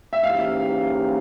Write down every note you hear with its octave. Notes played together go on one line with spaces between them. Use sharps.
E5
G#2 E3 A#3 C#4 G4 F5